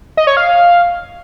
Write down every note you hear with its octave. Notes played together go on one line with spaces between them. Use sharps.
D#5
C#5
F5